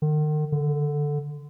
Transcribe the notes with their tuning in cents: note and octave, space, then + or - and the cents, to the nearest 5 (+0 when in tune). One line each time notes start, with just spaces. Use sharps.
D#3 -40
D3 +0